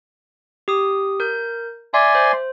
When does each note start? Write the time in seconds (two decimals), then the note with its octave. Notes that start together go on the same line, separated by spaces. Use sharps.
0.68 G4 D#6
1.20 A#4 G6
1.94 D5 E5 G#5 C6
2.15 C5